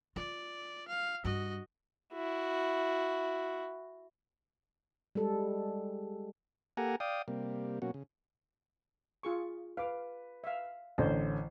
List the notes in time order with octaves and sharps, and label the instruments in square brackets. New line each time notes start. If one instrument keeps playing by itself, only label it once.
[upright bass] F4 [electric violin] D5
[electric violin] F5
[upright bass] G2 [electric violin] F#4 D#5
[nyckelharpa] E4 F#4
[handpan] G3 G#3 A4
[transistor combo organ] A#3 G4 A4 F#5 G#5 A#5
D5 F5 G5 D#6
C3 G3 A#3
B2 F#3 A#3 C#4 F#4
C#3
[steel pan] F4 G#4 C#6
[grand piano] B4 [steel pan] F5 D6
[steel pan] E5 F5
[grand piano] A1 D3 [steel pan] C#4 C5